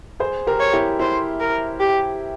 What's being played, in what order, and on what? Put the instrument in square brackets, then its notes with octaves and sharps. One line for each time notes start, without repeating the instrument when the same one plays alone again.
[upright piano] G#4 C5
G4 A#4
[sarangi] C#5
[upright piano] E4 G4
[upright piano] E4 [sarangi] C5
[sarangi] A#4
G4